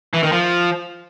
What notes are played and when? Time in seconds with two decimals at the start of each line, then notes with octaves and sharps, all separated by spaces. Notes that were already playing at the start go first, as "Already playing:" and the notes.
0.14 E3
0.23 D#3
0.32 F3